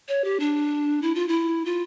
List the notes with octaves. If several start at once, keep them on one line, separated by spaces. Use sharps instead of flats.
C#5
G4
D4
E4
F4
E4
F4